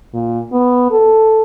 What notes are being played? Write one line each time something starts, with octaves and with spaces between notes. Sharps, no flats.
A#2
B3
A4